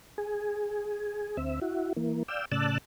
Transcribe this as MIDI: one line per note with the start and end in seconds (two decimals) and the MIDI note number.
0.18 1.37 68
1.37 1.60 38
1.37 1.60 60
1.37 1.60 76
1.61 1.93 64
1.61 1.93 66
1.96 2.23 52
1.96 2.23 58
2.28 2.45 74
2.28 2.45 77
2.28 2.45 79
2.28 2.45 88
2.52 2.78 45
2.52 2.78 49
2.52 2.78 74
2.52 2.78 81
2.52 2.78 88
2.52 2.78 90